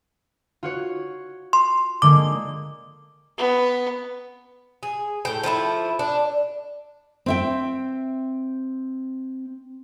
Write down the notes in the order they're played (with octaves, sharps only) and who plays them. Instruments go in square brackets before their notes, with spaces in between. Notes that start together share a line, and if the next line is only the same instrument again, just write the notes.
[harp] F4 F#4 C#5
[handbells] C6
[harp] D3 G#3 A#3 [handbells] D6
[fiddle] B3
[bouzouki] G#4
A2 G5
F3 A3 D#4 E4
D4
[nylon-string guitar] C4 E5 G5